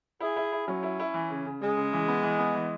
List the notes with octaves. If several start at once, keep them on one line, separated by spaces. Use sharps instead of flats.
E4 G#4
E4
E4
F#3 C#4
E4
E4
E3
C#3
C#3
C#3 G#3
C#3
E3
B3
E3
B3
E3